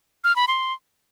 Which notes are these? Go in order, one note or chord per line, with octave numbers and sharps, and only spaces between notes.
F6
B5
C6